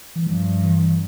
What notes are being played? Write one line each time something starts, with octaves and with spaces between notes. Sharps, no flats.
E3
G2 F3
E3